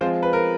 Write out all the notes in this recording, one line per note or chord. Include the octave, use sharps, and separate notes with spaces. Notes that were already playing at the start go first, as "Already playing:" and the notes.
F3 G#3 C4 F4 C5
B4
A#4